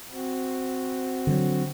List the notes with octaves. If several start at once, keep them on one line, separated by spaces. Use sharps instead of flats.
C4 F#4
D3 F3 F#3